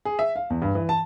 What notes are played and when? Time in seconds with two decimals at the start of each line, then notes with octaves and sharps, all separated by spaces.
0.05 G#4
0.19 E5
0.36 F5
0.50 E2
0.62 G2
0.75 E3
0.89 A5